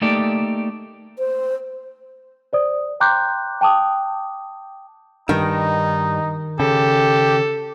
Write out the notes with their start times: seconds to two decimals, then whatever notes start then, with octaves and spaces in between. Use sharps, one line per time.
0.02 A3 A#3 D#4 G4 A4 D5
1.19 C5
2.53 C5 D5 D#6
3.00 G5 A#5 C6 D6 F#6 G6
3.61 G5 A5 D6 D#6
5.29 G2 D#3 D#4
6.60 C#3 G4 A4